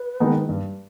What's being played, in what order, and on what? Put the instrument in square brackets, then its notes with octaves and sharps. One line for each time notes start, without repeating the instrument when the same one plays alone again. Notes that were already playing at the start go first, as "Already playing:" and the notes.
Already playing: [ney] B4
[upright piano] D#3 G#3 B3 D#4
[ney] E4
[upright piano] G2 [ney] G4